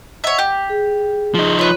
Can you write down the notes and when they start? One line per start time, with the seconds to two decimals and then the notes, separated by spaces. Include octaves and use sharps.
0.24 C#5 D#5 E5 F#5
0.39 G4 D6
0.69 G#4
1.34 F3 D#4
1.59 F4 B4 C#5 B5